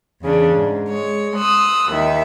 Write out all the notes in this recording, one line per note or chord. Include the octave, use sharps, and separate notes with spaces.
E2 C#3 C#4 D4
G#2
G#3 C#5
C6 D#6 E6 F#6
D#2 D#3 E5